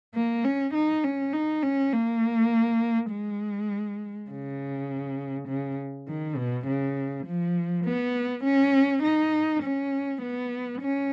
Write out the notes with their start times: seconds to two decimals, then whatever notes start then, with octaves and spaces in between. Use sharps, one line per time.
0.14 A#3
0.44 C#4
0.74 D#4
1.04 C#4
1.33 D#4
1.63 C#4
1.93 A#3
3.11 G#3
4.30 C#3
5.48 C#3
6.08 D#3
6.37 B2
6.67 C#3
7.26 F3
7.85 B3
8.44 C#4
9.03 D#4
9.63 C#4
10.22 B3
10.81 C#4